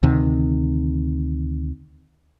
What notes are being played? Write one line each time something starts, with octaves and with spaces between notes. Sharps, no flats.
D2 C3 D#3